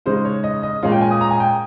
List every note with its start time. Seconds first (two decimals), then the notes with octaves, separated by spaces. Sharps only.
0.06 C#3 G#3 D#4 C5
0.25 C#5
0.44 D#5
0.63 D#5
0.83 A#2 G#3 C#4 F4 F5
0.92 G5
1.01 G#5
1.11 D#6
1.21 A#5
1.31 G#5
1.40 G5